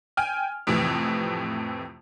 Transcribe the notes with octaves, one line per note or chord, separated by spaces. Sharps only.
G5 G#5 F6
F2 A2 C3 E3